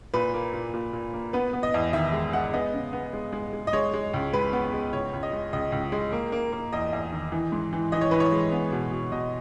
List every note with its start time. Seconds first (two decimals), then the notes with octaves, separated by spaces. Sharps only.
0.14 A#2 B4
0.34 A#3
0.54 A#2
0.74 A#2
0.93 A#2
1.13 A#3
1.33 B3 B4
1.53 B3
1.63 D#5
1.74 E2
1.93 D#3 E5
2.13 G#3
2.33 G#3 F#5
2.53 B3 D#5
2.73 C#3
2.93 B3
3.13 G#3
3.33 G#3
3.53 G#3
3.67 D#5
3.73 G#3 C#5
3.94 G#3
4.14 C#2
4.33 G#3 B4
4.53 B3
4.73 G#3
4.93 C#2 C#5
5.13 C#2
5.23 D#5
5.33 G#3
5.53 C#2 D#5
5.72 C#2
5.92 G#3
6.12 A#3
6.32 A#3
6.52 A#3
6.73 E2 D#5
6.93 E2
7.12 D#3
7.32 E3
7.52 G#2
7.73 E3
7.92 E3 D#5
8.01 C#5
8.11 E3 B4
8.20 C#5
8.32 G#3
8.52 B3
8.72 B2
8.92 B2
9.12 B2 D#5